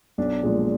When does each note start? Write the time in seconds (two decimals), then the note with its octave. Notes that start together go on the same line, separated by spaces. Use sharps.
0.18 B1 D4
0.43 A#2 F3 G#3